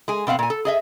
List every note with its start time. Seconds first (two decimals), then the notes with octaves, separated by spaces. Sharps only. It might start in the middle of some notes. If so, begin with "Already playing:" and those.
0.08 G#3 G#4
0.27 B2 C4 F5 F#5
0.39 A#2 G#5
0.50 A4
0.65 G#4 D#5 E5